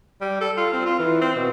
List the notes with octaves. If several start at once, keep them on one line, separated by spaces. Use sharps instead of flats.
G3
A4
F4
C4
F4
E3
C4
B2